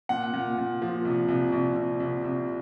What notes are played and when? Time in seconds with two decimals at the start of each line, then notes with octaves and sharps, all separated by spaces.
0.09 A#2 F#5
0.33 A#2
0.58 A#2
0.82 F3
1.05 C2
1.28 C2
1.52 C2
1.76 C2
2.00 C2
2.24 C2